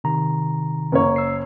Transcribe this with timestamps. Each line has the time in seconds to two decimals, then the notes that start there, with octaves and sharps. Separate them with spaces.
0.04 C3 D#3 A#5
0.92 F#1 A#3 C#5
1.16 E6 C7